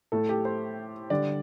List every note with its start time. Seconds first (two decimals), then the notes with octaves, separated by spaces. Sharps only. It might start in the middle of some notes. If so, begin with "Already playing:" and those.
0.12 A2 A3 A4
0.29 G4
0.45 C5
1.10 D3 G3 D5